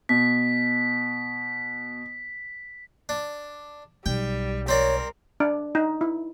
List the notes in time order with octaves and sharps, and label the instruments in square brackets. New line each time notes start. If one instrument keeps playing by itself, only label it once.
[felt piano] B2 [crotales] B6
[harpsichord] D4
[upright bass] B1 [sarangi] G3 [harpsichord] G5
[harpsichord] C4 D5 [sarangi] A#4 [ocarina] C#5
[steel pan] D4
D#4
E4